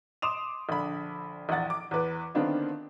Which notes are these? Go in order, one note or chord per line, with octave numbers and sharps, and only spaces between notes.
C6 D6 D#6 E7 F7
A#1 D3 B5
A#1 E2 F#5 A6
D6
E2 B4
D3 D#3 B3 C4 D4 F4